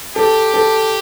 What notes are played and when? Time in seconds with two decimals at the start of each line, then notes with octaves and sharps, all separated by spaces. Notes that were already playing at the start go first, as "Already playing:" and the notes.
0.16 G4 A4
0.54 A4